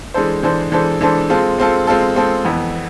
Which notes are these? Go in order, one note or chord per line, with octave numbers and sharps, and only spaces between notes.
E3 G#3 D4 A4 C5
E3 G#3 D4 A4 C5
E3 G#3 D4 A4 C5
E3 G#3 D4 A4 C5
G#3 C4 F4 A4
G#3 C4 F4 A4
G#3 C4 F4 A4
G#3 C4 F4 A4
F2 E3 B3